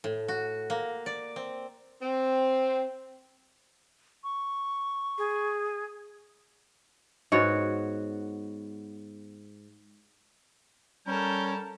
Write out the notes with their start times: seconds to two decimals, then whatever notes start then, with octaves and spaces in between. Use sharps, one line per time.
0.04 A2
0.28 F#4
0.70 A#3
1.06 D5
1.36 C4
2.02 C4
4.24 C#6
5.18 G#4
7.32 G#2 B3 F#4 C#5
11.07 G3 C#4 A4 A#4 G6